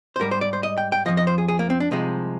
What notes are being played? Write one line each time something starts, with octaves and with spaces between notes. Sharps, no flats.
C5
G#2 G3 A#4
C5
D5
C5
D#5
G5
G5
F2 C3 F3 D#5
D#5
C5
G#4
G#4
A#3
C4
D4
C2 C3 F3 G#3 D#4